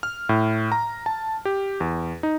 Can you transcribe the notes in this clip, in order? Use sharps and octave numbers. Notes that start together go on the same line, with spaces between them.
F6
A2
A#5
A5
G4
E2
D#4